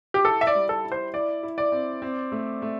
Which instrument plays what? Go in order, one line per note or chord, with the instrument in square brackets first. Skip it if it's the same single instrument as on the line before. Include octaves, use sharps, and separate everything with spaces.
[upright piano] G4
[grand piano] E4 [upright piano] A4
[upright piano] E5
D5
[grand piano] G3
[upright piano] A4
[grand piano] E4
[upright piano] C5
[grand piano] E4 [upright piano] D5
[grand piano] E4
[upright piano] D5
[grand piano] C4
C4
A3
A3